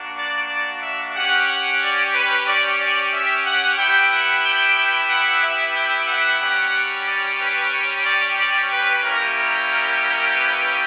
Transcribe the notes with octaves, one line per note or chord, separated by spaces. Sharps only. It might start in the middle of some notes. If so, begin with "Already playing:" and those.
Already playing: A#3 D4 F#4
D5
D5
E5
C#4 G4 F#5
F#5
D5
B4
D5
D5
E5
F#5
B3 E4 G4 G5
F#5
G5
G5
F#5
E5
G5
F#5
G3 C#4 G4
D5
B4
C#5
D5
D5
B4
G3 A#3 C#4 E4 G4 A#4
A#4
A#4
A#4
B4